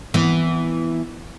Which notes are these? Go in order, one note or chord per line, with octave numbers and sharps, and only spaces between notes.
E3 B3